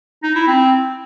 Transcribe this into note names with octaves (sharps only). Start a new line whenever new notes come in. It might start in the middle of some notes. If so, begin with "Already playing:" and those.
D#4
E4
C4